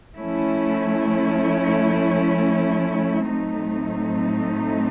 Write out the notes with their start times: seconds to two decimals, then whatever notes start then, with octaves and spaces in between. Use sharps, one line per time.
0.16 F3 A3 C#4 E4
3.29 A2 F#3 A3 C4 D#4